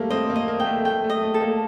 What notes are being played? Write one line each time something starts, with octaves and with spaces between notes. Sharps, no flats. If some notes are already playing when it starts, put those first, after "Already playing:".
Already playing: G3 A3 A#3
C4 D#5
A#3
D#5
A#3
G5
A3
A3 G5
A3
D#5
A3
A4
A#3